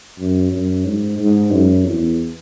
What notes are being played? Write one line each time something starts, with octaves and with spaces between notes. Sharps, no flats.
F#2
F#2
G#2
G#2
F#2
E2